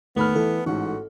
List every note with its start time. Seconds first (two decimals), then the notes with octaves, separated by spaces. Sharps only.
0.16 D#2 A3 B3 B5 F6
0.35 E3 A4
0.66 A1 G#2 F#4